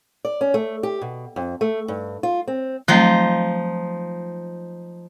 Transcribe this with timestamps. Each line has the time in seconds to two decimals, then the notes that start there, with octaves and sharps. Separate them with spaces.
0.25 D5
0.41 C#4
0.54 A3
0.83 G4
1.01 B2
1.36 F2
1.61 A3
1.88 G2
2.23 F4
2.48 C4
2.88 F3 F#3 A3 C4 D#4